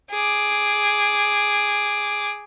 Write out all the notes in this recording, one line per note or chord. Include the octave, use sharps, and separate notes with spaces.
G#4 D6